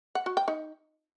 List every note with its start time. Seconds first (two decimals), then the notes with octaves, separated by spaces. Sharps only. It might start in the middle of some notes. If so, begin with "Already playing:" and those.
0.15 F#5
0.26 F#4
0.37 G5
0.48 D#4